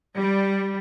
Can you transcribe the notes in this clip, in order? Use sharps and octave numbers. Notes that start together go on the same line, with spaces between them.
G3